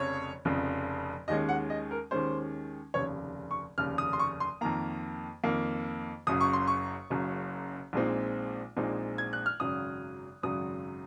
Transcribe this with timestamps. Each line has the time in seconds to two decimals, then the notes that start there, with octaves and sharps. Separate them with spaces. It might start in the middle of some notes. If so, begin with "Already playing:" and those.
Already playing: F1 F2 C#3 C#5
0.45 F1 F2 C#3
1.28 D#2 D#3 G#3 C#4 D#5
1.49 F#5
1.70 D#5
1.91 A#4
2.11 D#2 D#3 G#3 C#4 C5
2.94 F1 D#2 C#3 C#5
3.51 C#6
3.78 F1 D#2 C#3 F6
3.98 D#6
4.13 C6
4.19 C#6
4.40 C6
4.61 F2 D#3 A#3 A#5
5.44 F2 D#3 A#3
6.27 F#1 F#2 C#3 D#6
6.41 C#6
6.53 C6
6.67 C#6
7.10 F#1 F#2 C#3
7.93 A#1 A#2 G#3 C4 D#4
8.76 A#1 A#2 G#3 C4 D#4
9.18 G#6
9.33 F#6
9.46 F6
9.60 G#1 F#2 C#3 F#3 D#6
10.43 G#1 F#2 C#3 F#3 D#6